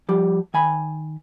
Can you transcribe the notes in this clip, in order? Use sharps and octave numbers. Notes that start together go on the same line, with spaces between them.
F3 G3 G4
D#3 G#5 B5